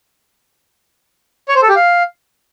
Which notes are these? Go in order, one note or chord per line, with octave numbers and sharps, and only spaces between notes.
C#5
C5
A4
G4
F5